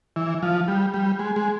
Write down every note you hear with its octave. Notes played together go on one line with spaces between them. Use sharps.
E3
F3
G3
G3
G#3
G#3